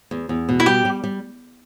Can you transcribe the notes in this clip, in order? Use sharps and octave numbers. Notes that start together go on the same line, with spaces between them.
E2
E2
B2
E4
G3 G4
G3
G3